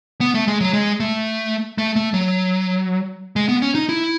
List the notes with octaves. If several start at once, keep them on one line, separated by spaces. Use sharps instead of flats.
B3
A3
G#3
F#3
G#3
A3
A3
A3
F#3
G#3
B3
C#4
D#4
E4